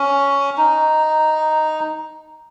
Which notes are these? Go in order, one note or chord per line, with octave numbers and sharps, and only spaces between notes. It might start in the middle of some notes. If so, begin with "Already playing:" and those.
Already playing: C#4
D#4